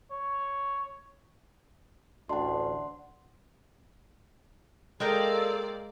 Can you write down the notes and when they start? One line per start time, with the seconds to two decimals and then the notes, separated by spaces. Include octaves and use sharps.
0.11 C#5
2.29 A1 D2 D4 F#5 C6
5.00 G#3 A#3 A4 A#4 C5 D5 D#5 G5